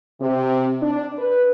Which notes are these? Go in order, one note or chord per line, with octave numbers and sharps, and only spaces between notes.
C3
D4
B4